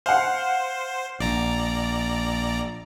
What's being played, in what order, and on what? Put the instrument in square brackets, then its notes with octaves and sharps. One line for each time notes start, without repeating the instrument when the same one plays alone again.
[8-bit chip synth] C5 [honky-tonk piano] F5 F#5
[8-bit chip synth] A#1 D5 A#5